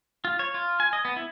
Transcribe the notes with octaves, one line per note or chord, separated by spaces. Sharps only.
F4
C#5
F4
G#5
D#5
B3
E4